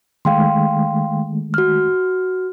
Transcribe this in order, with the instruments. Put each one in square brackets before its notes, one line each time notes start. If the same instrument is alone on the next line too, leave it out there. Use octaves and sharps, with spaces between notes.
[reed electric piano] D#3 G#3 A3 [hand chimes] F5 G5 C6
[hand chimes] F#4 F6